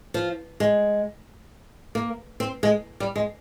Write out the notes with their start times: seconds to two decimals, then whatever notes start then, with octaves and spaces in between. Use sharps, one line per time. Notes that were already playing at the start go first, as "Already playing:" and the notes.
0.14 F3
0.60 G#3
1.95 A#3
2.40 C4
2.63 G#3
3.00 G3
3.16 G#3